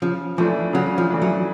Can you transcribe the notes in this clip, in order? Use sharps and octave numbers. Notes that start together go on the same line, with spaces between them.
C#3 F3
E3 F3 A3 D4
C#3 F#3
F3
E3 A3 D4
F#3